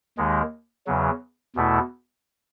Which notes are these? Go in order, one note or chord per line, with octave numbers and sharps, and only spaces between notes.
D#2 D#3 G#3
E2 C#3 F#3
E2 B2 A3 E4